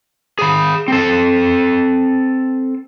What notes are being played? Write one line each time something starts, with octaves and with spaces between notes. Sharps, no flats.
G#4 B5
C4 A4